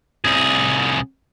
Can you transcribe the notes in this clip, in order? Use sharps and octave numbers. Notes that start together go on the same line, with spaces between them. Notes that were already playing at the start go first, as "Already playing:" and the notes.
C2 G#4